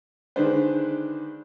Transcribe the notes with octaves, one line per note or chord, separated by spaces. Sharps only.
D3 D#3 G#3 D4 B4 C5